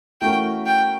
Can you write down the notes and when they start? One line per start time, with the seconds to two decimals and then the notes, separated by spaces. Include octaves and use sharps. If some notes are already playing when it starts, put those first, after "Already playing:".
0.21 E3 A3 C#4 F#4 A#4 G5
0.66 G5